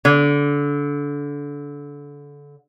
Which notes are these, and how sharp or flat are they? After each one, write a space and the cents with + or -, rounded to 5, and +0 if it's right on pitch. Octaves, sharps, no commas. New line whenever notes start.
D3 -25